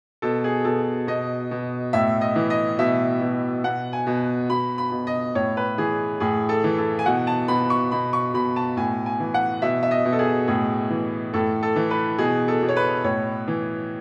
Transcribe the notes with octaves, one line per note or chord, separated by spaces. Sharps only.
B2 A4
G#4
B2 A4
B2 D#5
B2
A2 E5
D#5
E3
D#5
B2 E5
B2
B2 F#5
G#5
B2
B2 B5
B5
B2
D#5
A2 C#5
B4
E3 G#4
A2 G#4
A4
E3
A4
G#5
B2 F#5
A5
B2 B5
C#6
B2 B5
C#6
B2 B5
A5
A2 G#5
G#5
E3
F#5
B2 E5
E5
D#5
B2
A4
G#4
A2 G#4
E3
A2 A4
A4
E3
B4
B2 G#4
A4
B2
C#5
B4
A2 C#5
E3